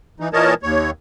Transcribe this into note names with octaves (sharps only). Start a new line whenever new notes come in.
E3 D#4
A#2 E3 A#4 C#5 D#5 A5
D#2 C#5